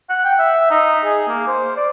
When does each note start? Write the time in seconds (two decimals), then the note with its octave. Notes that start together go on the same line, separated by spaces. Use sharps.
0.10 F#5
0.25 G5
0.39 E5
0.71 D#4
1.05 G#4
1.28 A#3
1.48 C5
1.77 D5